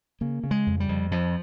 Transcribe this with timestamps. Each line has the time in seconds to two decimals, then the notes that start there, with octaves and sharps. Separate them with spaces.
0.21 C#3 A#3
0.44 C#3
0.51 G#3
0.67 F2
0.80 G3
0.89 F2
1.11 F2 F3